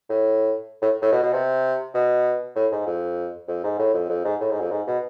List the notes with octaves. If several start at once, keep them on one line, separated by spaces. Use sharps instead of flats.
A2
A2
A2
B2
B2
C3
B2
A2
G#2
F2
F2
G#2
A2
F2
F2
G#2
A2
G#2
F2
G#2
B2